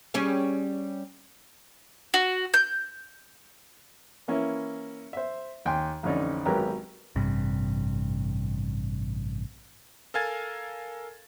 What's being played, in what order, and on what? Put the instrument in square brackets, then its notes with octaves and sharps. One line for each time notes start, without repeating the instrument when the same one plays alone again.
[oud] G3 C#4 G#4
[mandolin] F#4
G6
[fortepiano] E3 A#3 C#4 E4
C5 E5
D#2 G5 G#5 C6
A1 F2 D3 C#4 D#4 D5
G#1 F#3 B3 G4 A#4 A#5
[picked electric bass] A1 G2 C3
[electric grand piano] A4 A#4 F5 G#5 G#6 A6